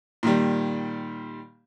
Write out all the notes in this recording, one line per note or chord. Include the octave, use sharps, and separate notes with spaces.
A#2 D#3 G3